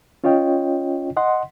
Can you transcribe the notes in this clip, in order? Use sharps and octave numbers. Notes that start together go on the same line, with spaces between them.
C#4 F4 C#5 D#5 G5
D#5 F#5 C6